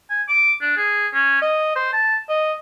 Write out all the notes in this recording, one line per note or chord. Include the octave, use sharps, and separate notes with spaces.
G#5
D6
D4
G#4
C#4
D#5
C5
A5
D#5